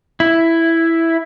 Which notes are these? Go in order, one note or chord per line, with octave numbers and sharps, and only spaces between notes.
E4